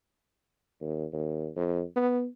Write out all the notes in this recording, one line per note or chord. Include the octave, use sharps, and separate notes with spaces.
D#2
D#2
F2
B3